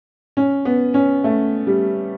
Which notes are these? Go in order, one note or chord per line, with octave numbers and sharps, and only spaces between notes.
C#4
B3
C#4
A3
G3